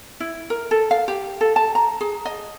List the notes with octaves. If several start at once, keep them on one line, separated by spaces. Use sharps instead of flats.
E4
A#4
A4
F5
G4
A4
A5
A#5
G#4
D#5